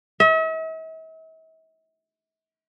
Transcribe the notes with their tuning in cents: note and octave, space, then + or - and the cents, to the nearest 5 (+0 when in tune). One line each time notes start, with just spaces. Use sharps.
E5 -45